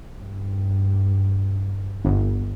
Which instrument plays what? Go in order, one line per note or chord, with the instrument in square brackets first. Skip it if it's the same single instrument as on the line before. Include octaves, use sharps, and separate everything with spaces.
[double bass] G2
[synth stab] G1